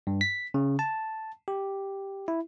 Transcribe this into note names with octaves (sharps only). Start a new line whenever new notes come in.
G2
B6
C#3
A5
G4
E4